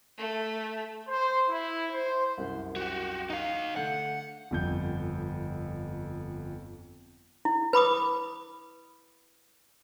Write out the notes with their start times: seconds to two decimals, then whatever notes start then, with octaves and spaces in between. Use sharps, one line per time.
0.19 A3
1.07 C5
1.49 E4
1.92 C5
2.38 C2 F#2
2.76 F#4 G4
3.30 D#4 F5
3.76 D3 A3 F#5 G6
4.51 G1 F2 G6
7.45 E4
7.73 B4 B5 D6 D#6